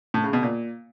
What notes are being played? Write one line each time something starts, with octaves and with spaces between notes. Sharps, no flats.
A2
C#3
B2
A#2